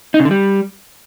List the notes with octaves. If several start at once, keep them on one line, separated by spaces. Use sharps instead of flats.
D#4
C#3
D3
G3